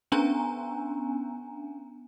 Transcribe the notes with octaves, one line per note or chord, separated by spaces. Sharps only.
B3 C#4 D4 G#5 A#5